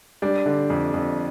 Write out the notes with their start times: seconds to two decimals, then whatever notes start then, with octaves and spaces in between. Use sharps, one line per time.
0.22 G3 D4
0.46 D3
0.70 F2
0.94 F2